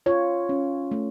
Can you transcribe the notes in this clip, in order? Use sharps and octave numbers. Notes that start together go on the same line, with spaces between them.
F4 C#5
C#4
A3